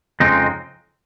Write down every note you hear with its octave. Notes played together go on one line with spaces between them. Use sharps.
F2 C#3 G#3 C4 D#4